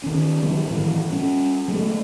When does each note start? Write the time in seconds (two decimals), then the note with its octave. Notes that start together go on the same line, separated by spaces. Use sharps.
0.04 D#3 C#4
0.43 D#3 F#3 G3 C4
0.66 A2 D#3 E3
1.11 G3 C#4
1.68 F#3 G#3 A3